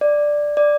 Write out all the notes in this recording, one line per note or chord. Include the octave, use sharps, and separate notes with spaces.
D5
D5